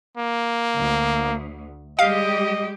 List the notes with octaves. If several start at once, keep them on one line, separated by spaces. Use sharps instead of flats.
A#3
D2
G3 G#3 G4 D#5 F5